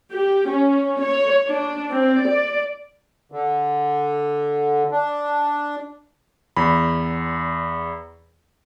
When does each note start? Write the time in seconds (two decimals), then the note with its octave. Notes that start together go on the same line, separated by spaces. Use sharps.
0.12 G4
0.49 C#4
1.02 C#5
1.47 D4
1.90 C4
2.23 D5
3.32 D3
4.92 D4
6.57 E2 B5